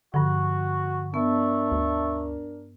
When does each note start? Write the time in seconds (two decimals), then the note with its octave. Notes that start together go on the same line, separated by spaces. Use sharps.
0.14 G2 D3 F3 F#4
1.14 B3 D4 A#4 E5 A5 C#6
1.72 D2